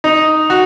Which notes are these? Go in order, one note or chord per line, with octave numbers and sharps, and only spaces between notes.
D#4
F#4